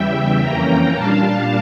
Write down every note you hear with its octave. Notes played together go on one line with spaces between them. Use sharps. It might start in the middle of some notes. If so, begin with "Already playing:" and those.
Already playing: E2 C#3 E3 G3 E5 G5
F2 E3 A#3 C#4 G5 A#5
A#2 G3 D4 F5 A5